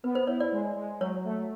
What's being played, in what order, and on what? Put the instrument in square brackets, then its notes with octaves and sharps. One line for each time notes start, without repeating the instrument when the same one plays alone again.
[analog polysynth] B3 [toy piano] B4
[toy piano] C5
[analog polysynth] E4 [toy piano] C#5
[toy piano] D5
[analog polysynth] G#3
G#3
[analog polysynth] F#3 [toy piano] C#5
[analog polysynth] A3